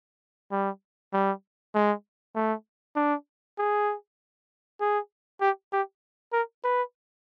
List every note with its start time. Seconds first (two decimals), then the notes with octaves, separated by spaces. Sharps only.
0.52 G3
1.13 G3
1.75 G#3
2.35 A3
2.96 D4
3.58 G#4
4.81 G#4
5.41 G4
5.72 G4
6.33 A#4
6.64 B4